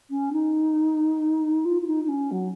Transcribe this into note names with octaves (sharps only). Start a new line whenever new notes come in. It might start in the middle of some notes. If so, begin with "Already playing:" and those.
C#4
D#4
F4
F4
D#4
D#4
C#4
F#3